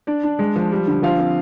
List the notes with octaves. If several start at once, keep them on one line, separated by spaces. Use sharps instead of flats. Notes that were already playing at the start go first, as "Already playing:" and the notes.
D4 D5
D4
G#3
F3
G3
D3
F3 F4 F5
C4